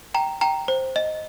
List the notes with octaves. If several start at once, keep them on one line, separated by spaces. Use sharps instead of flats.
G5 A#5
G5 A#5
C5
D#5